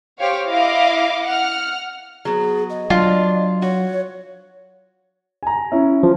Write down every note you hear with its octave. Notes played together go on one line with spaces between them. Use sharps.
G4 C5 C#5 F5
E4 D#5 F5 D6
F#5 F6
F#3 B3 G#4
D#5
F#3 D4 F4
F#4 C#5
G#5 A#5
C#4 E4
F3